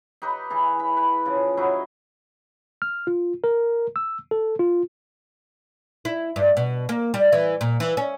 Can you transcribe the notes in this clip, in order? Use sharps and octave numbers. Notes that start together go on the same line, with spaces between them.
D#4 G4 B4
E3 E4 G#4
B5
B4
C#3 F3
F#3 D#4 E4 F#4
F6
F4
A#4
E6
A4
F4
E4
G2
B2
A#3
G3
E3
A#2
E3
C#4